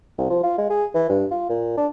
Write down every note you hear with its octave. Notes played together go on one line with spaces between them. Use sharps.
C2
F3
F4
G#3
G#4
E3
G2
F4
A#2
D4